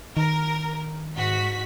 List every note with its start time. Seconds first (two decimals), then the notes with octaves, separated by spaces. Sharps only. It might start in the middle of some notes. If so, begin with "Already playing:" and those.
0.17 D#3 A#4
1.16 G#2 F#4 B6